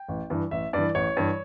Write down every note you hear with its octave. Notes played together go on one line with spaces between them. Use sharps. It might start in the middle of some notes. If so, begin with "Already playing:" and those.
Already playing: G5
A1
G2 E3
A1 E5
G2 E3 D5
A1 C#5
G2 E3